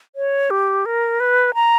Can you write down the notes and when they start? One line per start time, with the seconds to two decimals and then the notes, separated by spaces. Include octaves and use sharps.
0.16 C#5
0.50 G4
0.86 A#4
1.20 B4
1.54 A#5